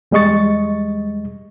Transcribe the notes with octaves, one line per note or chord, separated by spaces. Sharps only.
E2 G3 G#3 D#5 C#6 A6